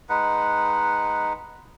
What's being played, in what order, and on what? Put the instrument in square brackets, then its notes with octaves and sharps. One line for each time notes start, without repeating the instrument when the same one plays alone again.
[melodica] G#3 D#4 B4 F#5